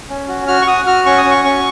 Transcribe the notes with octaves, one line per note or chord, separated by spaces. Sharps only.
C#4
F#4
F#4 F6
C#6
F#4 D#6
F#4 F6
C#4 C#6
D#6
C#4
C#6
C#4 C#6